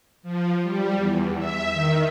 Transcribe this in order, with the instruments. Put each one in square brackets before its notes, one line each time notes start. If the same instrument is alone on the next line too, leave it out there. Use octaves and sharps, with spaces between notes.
[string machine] F3
G3
E2
E5
D#3